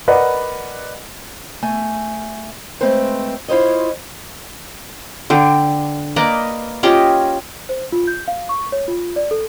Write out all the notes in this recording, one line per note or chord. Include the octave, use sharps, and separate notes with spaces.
A#4 B4 D5 D#5 F#5
A3 G#5
G#3 A3 C4 B4 C5
E4 F4 C5 C#5 D#5
D3 G5
A#3 B4 D5 D#5
C#4 F4 G4 D#5
C5
F4
G6
F5
C#6
C#5
F4
D5
A4